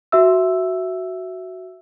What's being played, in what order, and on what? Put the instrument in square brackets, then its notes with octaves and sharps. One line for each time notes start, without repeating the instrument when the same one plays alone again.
[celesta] F#4 E5 E6